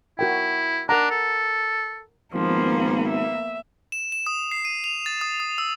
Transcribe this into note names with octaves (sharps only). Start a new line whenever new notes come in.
E4 F#4 A#4 G5
D4 A#4 F#5 A#5
A4
G#1 F3 A#3 B3
E5
E7
E7
D#6
C7
D#7
F7
A6
D#6
D#6
E6